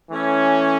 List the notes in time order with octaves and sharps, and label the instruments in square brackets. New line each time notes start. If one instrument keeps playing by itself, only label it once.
[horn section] E3 A3 C#4